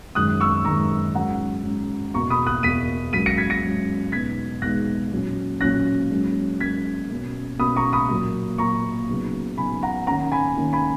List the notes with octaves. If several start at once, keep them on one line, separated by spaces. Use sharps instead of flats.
F#2 D#3 G#3 D#6 F#6
C#6 E6
F#2 D#3 G#3 A#5 C#6
G#2 F#3 C#4 F#5 A#5
G#2 F#3 C#4
E2 B2 A#3 A#5 C#6
B5 D#6
D#6 F#6
E2 B2 A#3 B6 D#7
G#2 F#3 C#4 B6 D#7
A#6 C#7
G#6 B6
A#6 C#7
G#2 F#3 C#4
E2 B2 G#3 B3 D#4 G#6 B6
E2 B2 G#3 B3 D#4 F#6 A#6
A#2 F#3 C#4
A#2 F#3 C#4 F#6 A#6
G#2 F#3 A#3 C#4
G#2 F#3 A#3 C#4 G#6 B6
B2 A#3 C#4
B2 A#3 C#4 B5 D#6
A#5 C#6
B5 D#6
A#2 F#3 A#3
A#2 F#3 A#3 A#5 C#6
C#3 F#3 B3 D#4
C#3 F#3 B3 D#4 G#5 B5
F#5 A#5
D#3 A#3 C#4 F#5 A#5
G#5 B5
D#3 A#3 C#4
G#5 B5